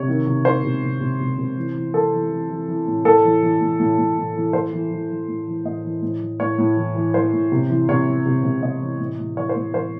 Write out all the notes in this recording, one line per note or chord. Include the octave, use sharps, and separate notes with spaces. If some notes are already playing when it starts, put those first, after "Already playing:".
Already playing: C3 C#5
D#3
C3
D#3 C5
C3
C3
C3
C3
C3
E3
E3
E3 A4
E3
E3
E3
E3
A2
A2 A4
E3
E3
A2
A2
A2
A2
E3
E3 C5
E3
E3
E3
A2
E3
A2 D#5
E3
A2
E3
A2 C#5
A2
E3
E3
E3 C5
A2
C3
E3
C3 C#5
E3
C3
C3
C3 D#5
E3
A2
A2
E3 C#5
C5
A2
E3 C5